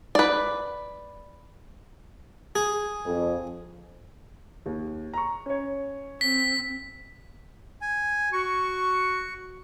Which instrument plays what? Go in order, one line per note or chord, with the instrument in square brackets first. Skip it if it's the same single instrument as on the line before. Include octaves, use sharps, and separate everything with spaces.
[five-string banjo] B4 D5
[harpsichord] G#4
[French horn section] F2
[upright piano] D#2
A#5 C#6
C#4 C#5
[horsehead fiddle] C4 [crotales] B6
[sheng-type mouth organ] G#5
[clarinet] F#4 [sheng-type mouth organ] C#6